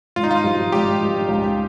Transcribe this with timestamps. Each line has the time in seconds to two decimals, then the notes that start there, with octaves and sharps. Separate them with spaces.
0.16 G#1 F4
0.24 D#4
0.31 F4
0.44 G2 F3
0.72 G#1 G4
1.00 G2 F3
1.28 C#2